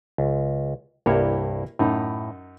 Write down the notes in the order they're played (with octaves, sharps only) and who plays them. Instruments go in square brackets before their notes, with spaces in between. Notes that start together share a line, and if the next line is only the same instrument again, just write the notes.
[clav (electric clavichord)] C#2
[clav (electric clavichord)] C2 G2 C#5 [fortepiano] A#3 E4 G4
[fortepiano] F#2 D#4 [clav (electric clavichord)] A2